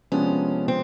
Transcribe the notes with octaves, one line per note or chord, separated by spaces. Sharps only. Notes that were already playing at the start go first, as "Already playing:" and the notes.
C3 F3 G#3 B3 C#4 D4
C4